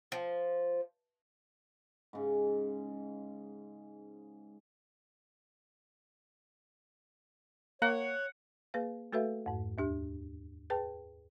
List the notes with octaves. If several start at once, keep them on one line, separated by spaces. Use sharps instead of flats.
F3
G#2 C#3
A#3 C#5 F#5
A#3 G#4 B4 F5
A3 F#4 A4 B4 E5 F5
F2 G#2
D#2 D4 G4
G#4 B4 G5 A5